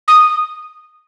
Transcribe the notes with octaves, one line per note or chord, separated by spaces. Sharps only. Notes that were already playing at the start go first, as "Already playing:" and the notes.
D#6